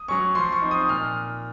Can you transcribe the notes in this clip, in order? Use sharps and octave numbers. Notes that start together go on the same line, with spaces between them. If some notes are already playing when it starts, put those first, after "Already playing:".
Already playing: D#6
F#3 C#4 C#6
F3 C6
C#6
C4 D#4
D#6
A#2 F6